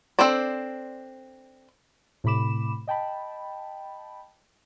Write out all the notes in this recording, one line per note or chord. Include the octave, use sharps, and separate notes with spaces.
C4 D4 A4 C5 D5
A2 C3 A3 B5 D6 E7
D#5 G5 A5 B5